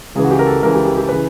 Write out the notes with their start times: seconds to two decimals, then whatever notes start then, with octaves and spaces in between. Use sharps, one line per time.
0.15 C#2 C#3 E3 G#4
0.24 F#4
0.31 G4
0.39 A#4
0.46 A4
0.62 C#2 C#3 E3 A#4
0.75 G4
0.85 G4
0.97 G4
1.09 C#3 E3 B4